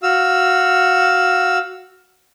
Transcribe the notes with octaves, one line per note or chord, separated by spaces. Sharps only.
F#4 F5 E6